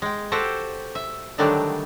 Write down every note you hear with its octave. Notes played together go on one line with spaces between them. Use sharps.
G#3 G5
F#4 G4 A4 C5 F#5 G5
E5
D3 D#3 F#3 G3 A3 D4